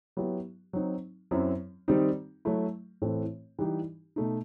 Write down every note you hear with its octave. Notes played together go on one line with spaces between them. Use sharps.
F#3 B3 E4 G4
F#3 C4 D#4
F#2 F#3 C4 E4
D#3 G3 C4 D#4
F#3 A3 E4
A2 E3 A3 C4
E3 G3 D#4 G4
B2 A3 D#4